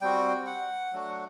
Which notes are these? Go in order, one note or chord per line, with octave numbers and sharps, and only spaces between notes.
G3 C4 F#4 G5
F#5
F#3 A3 D4 F#4